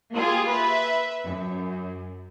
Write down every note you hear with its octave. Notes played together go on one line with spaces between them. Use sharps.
A#3 F4 G4 G#4
B4 E5
F#2